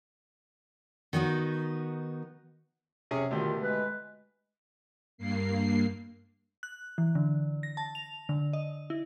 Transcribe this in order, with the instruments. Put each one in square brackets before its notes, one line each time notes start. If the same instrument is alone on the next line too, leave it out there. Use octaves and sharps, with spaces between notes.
[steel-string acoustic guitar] D#3 B3 D#4 F#4
[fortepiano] C3 C#4 G#4
[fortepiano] D2 B2 G4 [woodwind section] D#3 F4
[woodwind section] G#3 B4
[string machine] G2 A#3 C7
[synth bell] F#6
E3
D3
A#6
A5
F7
D3
D#5
E4